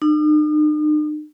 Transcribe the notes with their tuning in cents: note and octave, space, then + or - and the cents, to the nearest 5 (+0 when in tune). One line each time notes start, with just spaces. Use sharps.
D#4 -45